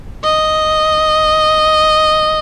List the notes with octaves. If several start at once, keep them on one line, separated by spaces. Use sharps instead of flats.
D#5